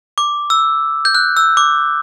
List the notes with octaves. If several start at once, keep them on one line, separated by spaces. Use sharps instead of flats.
D6
E6
G6
F#6
E6
D6